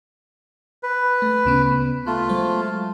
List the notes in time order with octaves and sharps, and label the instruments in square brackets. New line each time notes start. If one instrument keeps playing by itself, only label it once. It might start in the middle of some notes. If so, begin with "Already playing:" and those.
[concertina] B4
[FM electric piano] A3
D2 C#3 B3
[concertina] A3 F4 [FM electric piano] B3 F#6
[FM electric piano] F#3 G#3 C5